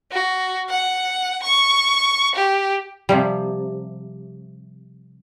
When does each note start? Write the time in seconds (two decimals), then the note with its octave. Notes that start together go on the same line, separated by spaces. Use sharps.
0.12 F#4
0.70 F#5
1.43 C#6
2.36 G4
3.09 C3 F3 G3